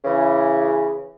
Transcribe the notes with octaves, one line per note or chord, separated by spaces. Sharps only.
C#3 E3